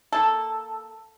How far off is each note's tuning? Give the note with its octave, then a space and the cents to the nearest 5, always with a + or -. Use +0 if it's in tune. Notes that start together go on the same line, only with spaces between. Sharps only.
A#3 +0 A4 +0